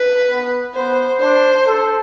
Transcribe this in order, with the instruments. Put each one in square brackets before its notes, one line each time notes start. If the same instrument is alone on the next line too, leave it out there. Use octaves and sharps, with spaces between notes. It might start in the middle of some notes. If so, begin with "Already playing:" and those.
Already playing: [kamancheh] B4
[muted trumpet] B3
[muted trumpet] B3 [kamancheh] C5
[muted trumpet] D4 [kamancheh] C5
[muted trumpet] A4